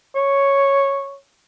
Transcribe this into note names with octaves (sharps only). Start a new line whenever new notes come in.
C#5